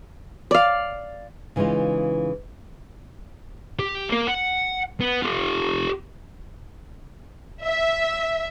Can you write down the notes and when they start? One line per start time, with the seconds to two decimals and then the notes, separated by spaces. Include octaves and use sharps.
0.51 D5 F5
1.56 C#3 E3 G#3 D#4 F4
3.79 G4
4.09 A#3 A#4
4.27 F#5
5.01 B3
5.22 F4 G4
7.63 E5